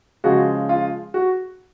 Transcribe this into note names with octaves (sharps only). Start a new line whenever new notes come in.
C#3 F3 G#3 F#4
F4
F#4